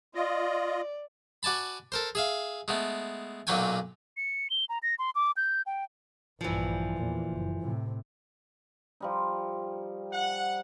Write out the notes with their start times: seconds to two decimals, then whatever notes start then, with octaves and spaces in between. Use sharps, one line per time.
0.15 F4 D5 D#5
1.43 F#4 D5 G#5 A5 B5
1.92 A4 A#4 C5
2.15 G#4 E5 F5
2.68 G#3 A3 B3
3.47 B1 A#2 F#3 C#4 G5 G#5
4.17 C#7
4.50 G7
4.69 A#5
4.83 A#6
4.99 C6
5.15 D6
5.37 G6
5.66 G5
6.41 A#1 G2 E3 F3
6.97 E2 A#2
7.29 F#1
7.61 A2 C3
9.00 F3 G3 D#4
10.12 F#5